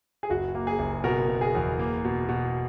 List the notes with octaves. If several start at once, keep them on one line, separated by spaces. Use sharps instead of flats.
G#4
F#1 F#4
A#3
G#4
F#1
B2 F#4 A#4
B2
G#4
E2
A#3
B2
B2